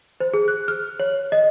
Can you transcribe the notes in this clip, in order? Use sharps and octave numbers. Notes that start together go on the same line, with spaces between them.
C5
G#4
F#6
F6
C#5
D#5